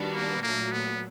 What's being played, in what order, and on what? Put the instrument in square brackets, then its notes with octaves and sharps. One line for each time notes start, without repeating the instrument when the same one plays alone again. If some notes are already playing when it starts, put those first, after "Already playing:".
Already playing: [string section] D#3 G3 B3 D4 F#4
[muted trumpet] A#3
[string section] A#2 F#3 A3 [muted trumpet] A#3
[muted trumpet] B3